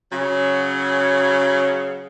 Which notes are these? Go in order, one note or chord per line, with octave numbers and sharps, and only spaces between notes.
C#3 F#3